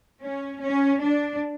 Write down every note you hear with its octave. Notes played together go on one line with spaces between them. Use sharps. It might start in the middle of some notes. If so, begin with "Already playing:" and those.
C#4
C#4
D4